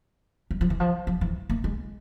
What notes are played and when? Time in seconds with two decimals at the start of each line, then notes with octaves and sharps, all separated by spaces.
0.51 G3
0.61 F3
0.70 E3
0.80 F3
1.07 F3
1.21 E3
1.50 A#3
1.64 G#3